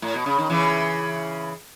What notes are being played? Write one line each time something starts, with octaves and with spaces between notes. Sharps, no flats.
A2
B2
C#3
D#3
C#3 E3